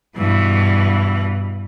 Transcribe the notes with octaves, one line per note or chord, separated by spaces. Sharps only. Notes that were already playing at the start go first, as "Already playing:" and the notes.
G2 B2 E3